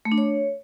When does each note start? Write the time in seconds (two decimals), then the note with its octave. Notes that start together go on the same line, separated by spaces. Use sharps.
0.05 A3
0.12 D4
0.18 C#5